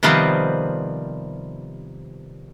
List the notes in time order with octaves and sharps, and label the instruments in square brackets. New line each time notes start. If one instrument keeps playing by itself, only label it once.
[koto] C3 D#3 F3 G3 B3 C4